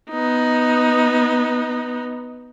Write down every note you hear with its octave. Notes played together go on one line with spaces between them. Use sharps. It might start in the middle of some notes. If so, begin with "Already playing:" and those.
B3 D#4